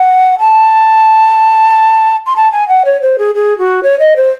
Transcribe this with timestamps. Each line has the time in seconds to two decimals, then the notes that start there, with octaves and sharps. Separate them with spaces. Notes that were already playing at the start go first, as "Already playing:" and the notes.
Already playing: F#5
0.39 A5
2.26 C6
2.36 A5
2.52 G#5
2.68 F#5
2.85 C#5
3.01 C5
3.18 G#4
3.35 G#4
3.58 F#4
3.83 C#5
3.99 D#5
4.16 C5